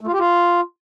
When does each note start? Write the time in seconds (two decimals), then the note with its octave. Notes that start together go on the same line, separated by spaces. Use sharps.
0.01 A3
0.07 F4
0.13 G4
0.19 F4